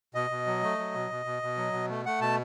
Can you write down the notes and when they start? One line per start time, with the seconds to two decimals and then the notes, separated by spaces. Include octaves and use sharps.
0.15 B2 D#5
0.30 B2
0.46 F#3
0.63 A3
0.78 F#3
0.95 B2
1.11 B2
1.26 B2
1.43 B2
1.57 F#3
1.73 B2
1.89 A3
2.06 A3 F#5
2.21 B2 A5